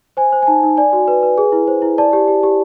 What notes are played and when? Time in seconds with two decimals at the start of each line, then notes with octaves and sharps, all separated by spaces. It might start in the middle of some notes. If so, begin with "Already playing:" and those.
0.17 C5 G#5
0.32 C5
0.42 G#5
0.47 D#4 A5
0.63 D#4
0.77 D5 G#5
0.93 F#4
1.08 B4
1.23 B4
1.38 G#4
1.52 E4
1.67 C5
1.82 E4
1.98 D5 A5
2.13 G4
2.28 G4
2.43 G4